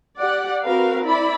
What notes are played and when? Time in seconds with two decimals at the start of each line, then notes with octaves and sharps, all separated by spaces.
0.19 G4 D5 F#5
0.64 C4 F#4 A#4 B4 F5
1.06 E4 D5 B5